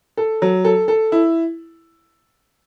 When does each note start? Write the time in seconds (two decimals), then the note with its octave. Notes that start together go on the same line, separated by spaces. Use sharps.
0.17 A4
0.42 F#3
0.65 A4
0.88 A4
1.12 E4